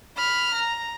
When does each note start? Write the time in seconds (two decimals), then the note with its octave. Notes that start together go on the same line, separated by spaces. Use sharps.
0.17 B5 F6
0.55 A#5